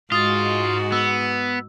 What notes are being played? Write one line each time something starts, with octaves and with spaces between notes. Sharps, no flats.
G#2 G#3 F4 F#4 D#6 A6
B3 E6